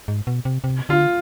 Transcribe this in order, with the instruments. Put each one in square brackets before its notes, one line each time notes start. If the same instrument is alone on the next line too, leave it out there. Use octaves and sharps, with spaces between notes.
[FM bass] G#2
B2
C3
C3
[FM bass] D3 [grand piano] F4